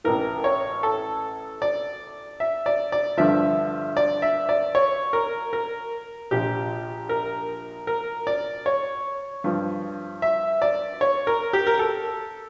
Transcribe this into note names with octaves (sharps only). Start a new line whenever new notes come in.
A1 A2 E3 A#4
C#5
A4
D5
E5
D5
D5
G2 D3 F3 E5
D5
E5
D5
C#5
A#4
A#4
A#1 A#2 F3 G4
A#4
A#4
D5
C#5
G2 F3
E5
D5
C#5
A#4
G4
A#4
A4